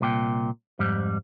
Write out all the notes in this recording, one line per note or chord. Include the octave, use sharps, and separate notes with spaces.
C2 A#2 G5
F2 G#2 G3